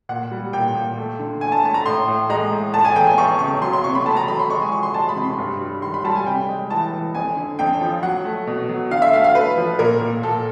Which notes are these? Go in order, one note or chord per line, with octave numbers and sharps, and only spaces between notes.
A#2 F#5
G3
A#2 G5
A#2
A3
D3
A3 G#5
A5
A3 A5
A#5
A2 C6
A2
G#3 A#5
A2
A3 A5
G#5
E2 G5
G#5
E2 C#6
C#3 C#6
F#3 C6
C6
C3 C#6
B5
A3 A5
A#5
F#3 B5
C6
G#3 C#6
G#5
F3 C#6
C6
G#3 A5
B5
C3
C6
G2
G3
D#3 C6
B5
G3 A5
G#5
C3 G5
G#3
E3 A5
E3
F2 G#5
D3
F2 G5
F3
F#3 F#5
A3
B2
F#3
D3 F5
E5
A3 F5
F5
A3 B4
F3
A#2 A#4
A#2
A#2 A4